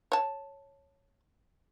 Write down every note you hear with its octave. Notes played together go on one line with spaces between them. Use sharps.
C#5 A5